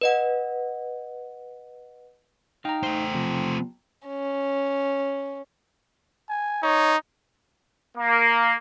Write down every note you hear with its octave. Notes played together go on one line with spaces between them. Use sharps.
B4 D#5 F#5
D#4 F5 G5 A#5
A3 C5
C3 F3
C#4
G#5
D#4 C#5
A#3